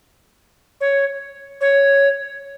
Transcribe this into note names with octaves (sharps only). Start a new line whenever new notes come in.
C#5
C#5